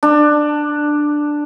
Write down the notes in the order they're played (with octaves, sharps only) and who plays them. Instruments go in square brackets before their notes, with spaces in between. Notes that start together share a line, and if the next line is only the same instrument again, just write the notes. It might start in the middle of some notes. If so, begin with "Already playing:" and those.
[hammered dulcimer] D4